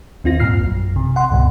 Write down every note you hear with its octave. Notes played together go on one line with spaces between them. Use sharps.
D#2 C4 F4 A#6
G2 A#2 F6 C7
A#1 F#2
C3
F#5 C6
C#2 G2 B2